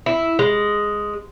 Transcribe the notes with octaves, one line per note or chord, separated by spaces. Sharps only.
E4
G#3